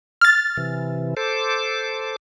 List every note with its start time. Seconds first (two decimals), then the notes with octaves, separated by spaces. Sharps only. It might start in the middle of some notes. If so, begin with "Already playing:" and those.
0.21 F6 A6
0.57 C3 E3
1.17 A4 C5 D6